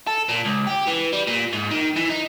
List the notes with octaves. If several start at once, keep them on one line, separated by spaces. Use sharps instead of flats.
A4
A#2
C#2
G4
E3
G3
A#2
G#2
D#3
E3
D#4